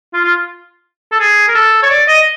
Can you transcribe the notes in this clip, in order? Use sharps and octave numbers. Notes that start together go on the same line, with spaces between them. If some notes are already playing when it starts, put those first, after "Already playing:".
F4
F4
A4
G#4
A#4
A4
C#5
D5
D#5